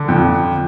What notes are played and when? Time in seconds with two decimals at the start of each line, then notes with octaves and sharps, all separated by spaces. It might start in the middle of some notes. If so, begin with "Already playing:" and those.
Already playing: D3
0.08 F2